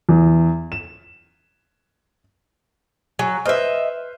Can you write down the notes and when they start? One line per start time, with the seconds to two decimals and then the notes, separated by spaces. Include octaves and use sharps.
0.09 E2
0.72 E7
3.19 F#3 G#5
3.46 B4 C5 D#5 E5 F6